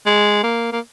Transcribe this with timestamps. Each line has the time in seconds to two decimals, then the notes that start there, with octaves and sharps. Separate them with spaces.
0.06 G#3
0.43 A#3
0.72 A#3